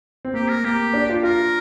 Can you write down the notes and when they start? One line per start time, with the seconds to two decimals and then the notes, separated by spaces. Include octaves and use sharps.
0.25 C4
0.34 A#3 G4
0.49 A#4
0.64 A#3 G4
0.94 D4
1.09 F4
1.23 F4 A#4